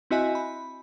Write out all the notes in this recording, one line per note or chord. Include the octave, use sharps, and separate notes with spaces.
C4 E4 F#4 D#5 E5 G#5
B5